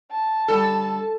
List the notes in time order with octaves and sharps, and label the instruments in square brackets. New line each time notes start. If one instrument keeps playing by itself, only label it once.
[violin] A5
[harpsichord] D3 G3 [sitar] A4